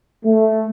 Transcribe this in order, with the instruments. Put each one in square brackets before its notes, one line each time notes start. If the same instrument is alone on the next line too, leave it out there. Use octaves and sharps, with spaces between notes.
[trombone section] A3